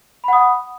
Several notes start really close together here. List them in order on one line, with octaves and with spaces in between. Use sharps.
B5 F#5 D#6